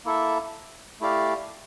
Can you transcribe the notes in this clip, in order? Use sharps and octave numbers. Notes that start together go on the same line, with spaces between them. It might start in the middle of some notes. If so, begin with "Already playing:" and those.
A#3 E4 A4 E5
A3 E4 G4 D5 F5